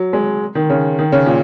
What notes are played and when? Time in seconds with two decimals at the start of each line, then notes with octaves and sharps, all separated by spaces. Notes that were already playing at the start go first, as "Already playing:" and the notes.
Already playing: F#3
0.13 G#3
0.55 D#3
0.70 C#3
0.99 D#3
1.12 C#3
1.26 A#2